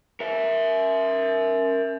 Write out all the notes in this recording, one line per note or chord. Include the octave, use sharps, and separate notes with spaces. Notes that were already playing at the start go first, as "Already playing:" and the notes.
A#4 E5